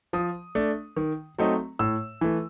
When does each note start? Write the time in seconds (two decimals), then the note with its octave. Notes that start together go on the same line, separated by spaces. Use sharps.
0.13 F3 D#6
0.55 A3 D4
0.97 D#3
1.38 F#3 A3 C4 D#4
1.79 A2 E6
2.21 E3 A3